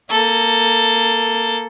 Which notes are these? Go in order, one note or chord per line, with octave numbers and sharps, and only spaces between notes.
A#3 A4